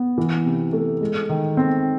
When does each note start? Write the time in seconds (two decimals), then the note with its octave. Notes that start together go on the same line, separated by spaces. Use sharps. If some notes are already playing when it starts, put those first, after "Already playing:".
Already playing: B3
0.18 E3
0.45 C3
0.73 A3
1.01 G#3
1.29 D#3
1.57 C4